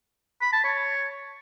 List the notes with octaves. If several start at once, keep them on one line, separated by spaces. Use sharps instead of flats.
B5
A5
C#5